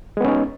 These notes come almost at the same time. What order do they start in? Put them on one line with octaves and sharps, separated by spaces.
G#3 B3 C#4 D#4